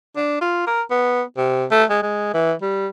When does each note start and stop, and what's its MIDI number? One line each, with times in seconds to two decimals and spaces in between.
0.16 0.38 62
0.41 0.62 65
0.67 0.82 70
0.90 1.22 59
1.37 1.65 48
1.71 1.83 57
1.90 2.02 56
2.03 2.31 56
2.34 2.53 52
2.62 2.87 55